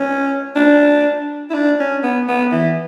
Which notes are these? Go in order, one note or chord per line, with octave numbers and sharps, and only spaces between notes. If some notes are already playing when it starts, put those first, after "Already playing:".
Already playing: C#4
D4
E4
D4
C#4
B3
B3
E3